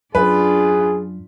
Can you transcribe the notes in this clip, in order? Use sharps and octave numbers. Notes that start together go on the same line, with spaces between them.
F#2 D4 F4 G#4 B4